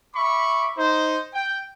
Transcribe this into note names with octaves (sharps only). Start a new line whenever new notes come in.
E5 B5 C#6 D6
D#4 C5
G5